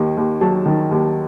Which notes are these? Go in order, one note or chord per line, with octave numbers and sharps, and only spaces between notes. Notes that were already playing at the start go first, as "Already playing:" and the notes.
Already playing: D#2 D#3
D#2
F#3 A5
D#3
D#2